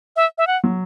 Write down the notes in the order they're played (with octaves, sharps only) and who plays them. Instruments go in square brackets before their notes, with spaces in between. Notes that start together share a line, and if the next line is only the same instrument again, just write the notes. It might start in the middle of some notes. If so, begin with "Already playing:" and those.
[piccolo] E5
E5
F#5
[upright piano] F#3